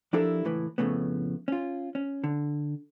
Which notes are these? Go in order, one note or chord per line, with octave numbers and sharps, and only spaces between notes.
F3 D4 E4 G4 A4 A#4
C#2 A2 E3 B4
F2 A2 C#3 A3 B3
C#4 F4
C#4
D3